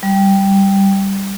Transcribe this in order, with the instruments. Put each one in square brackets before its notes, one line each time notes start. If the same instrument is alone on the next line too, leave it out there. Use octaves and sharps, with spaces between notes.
[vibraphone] G3